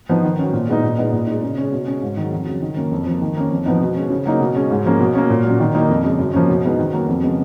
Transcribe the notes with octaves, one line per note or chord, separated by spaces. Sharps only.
F3 B3 D#4
D#3
F#3 C#4
A#2
G#3 B3 D#4
A#2
G#3 B3 D#4
A#2
G#3 D#4
C#3
G#3 C#4
B2
G#3 C#4
G#2
D#3 F#3
F2
C#3 F#3
D#3
A#3 C#4
F2
F3
A#3
D#3
A#3 C#4
F2
F3 B3 D#4
B2
G#3 C#4
C#3
F#3 A#3 D#4
B2
G#3 C#4
G#2
F3 A#3 C#4
B2
A#3 C#4
A#2
F#3
C#4
D#3
A#3 D#4
F2
C#3 G#3
F#2
F3 A#3 C#4
B2
G#3 B3 D#4
D#3
F#3 A#3
F2
C#3 G#3 B3